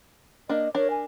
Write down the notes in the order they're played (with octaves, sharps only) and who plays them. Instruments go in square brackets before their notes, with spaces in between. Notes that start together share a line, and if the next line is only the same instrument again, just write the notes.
[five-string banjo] A#3 D4 [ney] D#5
[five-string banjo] D4 A#4 [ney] C#5
[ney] G#5